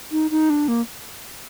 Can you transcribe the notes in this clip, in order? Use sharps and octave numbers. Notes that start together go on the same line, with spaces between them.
D#4
D#4
D4
A#3